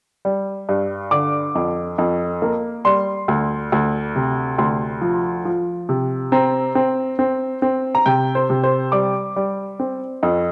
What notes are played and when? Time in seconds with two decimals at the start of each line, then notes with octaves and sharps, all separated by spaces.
0.25 G3
0.69 G2
1.11 D3 D6
1.55 F2
1.98 F2
2.42 A#3
2.85 G3 C6
3.28 D2
3.72 D2
4.16 C3
4.58 D2 C6
5.01 F3
5.45 F3
5.89 C3
6.32 C4 A#5
6.75 C4
7.19 C4
7.62 C4
7.95 A#5
8.06 C3 G5
8.35 C5
8.50 C3
8.63 C5
8.92 G3 D6
9.36 G3
9.80 C4
10.23 F2